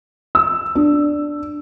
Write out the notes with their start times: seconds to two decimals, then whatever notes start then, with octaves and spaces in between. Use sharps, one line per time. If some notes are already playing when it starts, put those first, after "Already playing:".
0.35 E6
0.75 D4